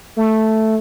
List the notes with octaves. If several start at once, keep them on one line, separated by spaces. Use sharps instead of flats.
A3